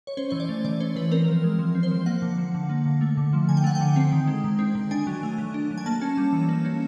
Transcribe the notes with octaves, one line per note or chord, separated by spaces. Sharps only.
C#5
C#4 C5
E3 C#5
D5
A3
E3 D5
C#4 C5
E3 B4
C4 A#4
F3
G#3
F3
C4
C5
F3
A#3 F#5
D3
F3
D3
A#3
D3
A3
D3
F3
D3 G#5
G5
A3 F#5
G5
D3
C4
D#3
G#3
D#3
C4
D#3
D4 G#5
F#3
A3
F#3
D4
F#3
G#5
A#3 A5
C#4
G3
E3
A#3
C#4